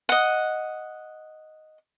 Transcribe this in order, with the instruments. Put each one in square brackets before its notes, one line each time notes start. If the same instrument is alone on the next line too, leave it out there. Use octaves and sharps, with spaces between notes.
[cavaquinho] D#5 F#5